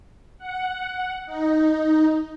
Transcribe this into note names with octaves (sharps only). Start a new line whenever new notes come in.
F#5
D#4